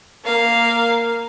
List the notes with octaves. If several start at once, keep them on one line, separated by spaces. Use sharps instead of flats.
A#3 F5